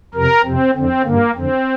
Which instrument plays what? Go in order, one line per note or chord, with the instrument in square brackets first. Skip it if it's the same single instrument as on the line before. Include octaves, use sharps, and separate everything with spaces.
[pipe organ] F2 C3 A#4
F2 C3 C4
F2 D3 C4
G2 D3 A#3
F2 D3 C4